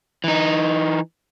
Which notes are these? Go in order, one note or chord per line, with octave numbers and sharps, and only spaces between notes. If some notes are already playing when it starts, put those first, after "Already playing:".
E3 D#4